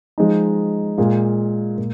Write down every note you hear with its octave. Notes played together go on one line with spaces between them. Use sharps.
F3 G#3 D#4
A#2 G#3 F4
A#2